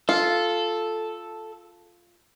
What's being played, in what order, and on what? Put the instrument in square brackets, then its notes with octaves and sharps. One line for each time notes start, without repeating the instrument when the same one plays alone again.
[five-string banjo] F4 [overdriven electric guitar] A4